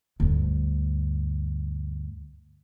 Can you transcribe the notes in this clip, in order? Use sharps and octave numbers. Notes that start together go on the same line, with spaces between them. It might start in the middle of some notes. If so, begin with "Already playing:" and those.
D2 G2